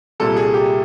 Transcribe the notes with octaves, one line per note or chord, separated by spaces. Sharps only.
C2 A#2 G3 A4
G#4
G4